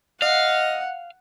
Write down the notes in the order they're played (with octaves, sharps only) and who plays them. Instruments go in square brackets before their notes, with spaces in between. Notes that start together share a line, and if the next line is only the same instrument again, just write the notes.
[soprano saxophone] D#5 [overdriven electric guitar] F5 [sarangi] F#5